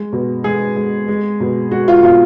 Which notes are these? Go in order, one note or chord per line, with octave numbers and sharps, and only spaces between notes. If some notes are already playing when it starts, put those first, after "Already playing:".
Already playing: G#3
B2
G#3 G#4
G#3
G#3
B2
G#3 F#4
F4
B2 F4